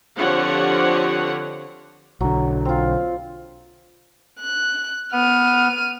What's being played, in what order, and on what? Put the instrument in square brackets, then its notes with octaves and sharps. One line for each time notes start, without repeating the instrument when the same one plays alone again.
[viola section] D3 F3 C4 G4 C#5 F#5
[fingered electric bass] B1 D3 [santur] F#3
[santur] C4 F4
[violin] F#6
[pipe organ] B3 [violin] F6 D#7